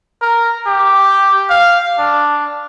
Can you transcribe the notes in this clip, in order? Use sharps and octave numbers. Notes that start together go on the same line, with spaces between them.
A#4
G4
F5
D4